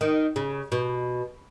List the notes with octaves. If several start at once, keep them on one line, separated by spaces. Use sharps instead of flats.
D#3
C#3
B2